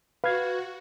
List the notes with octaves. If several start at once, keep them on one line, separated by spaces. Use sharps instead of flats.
F#4 B4 F5 G#6